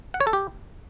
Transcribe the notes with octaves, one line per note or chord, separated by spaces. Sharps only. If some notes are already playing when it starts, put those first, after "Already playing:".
F#5
C#5
A4
G4